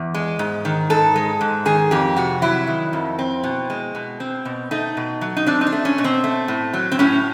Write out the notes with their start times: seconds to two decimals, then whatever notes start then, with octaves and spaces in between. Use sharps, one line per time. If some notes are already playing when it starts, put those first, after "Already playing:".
Already playing: E2
0.14 G#3
0.39 G#2
0.65 D#3
0.90 G#2 A4
1.16 G#3
1.41 G#2
1.65 D#3 G#4
1.91 F2 G4
2.16 C3 F#4
2.42 F#3 E4
2.67 D#3
2.93 F2
3.19 C4
3.44 B2
3.70 G#3
3.95 B2
4.20 C4
4.45 B2
4.71 A3 D#4
4.97 B2
5.21 F#3
5.37 D#4
5.46 C4 D4
5.61 D#4
5.67 D4
5.72 A3
5.85 C#4
5.98 B2
6.04 C4
6.24 A3
6.48 A2
6.73 F#3
6.92 C4
6.99 A2 C#4